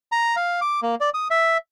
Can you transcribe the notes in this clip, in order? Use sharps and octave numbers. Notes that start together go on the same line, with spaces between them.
A#5
F5
D6
A#3
D5
D#6
E5